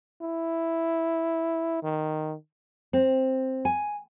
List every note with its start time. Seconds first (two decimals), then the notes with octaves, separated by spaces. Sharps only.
0.22 E4
1.83 D#3
2.93 C4
3.65 G#5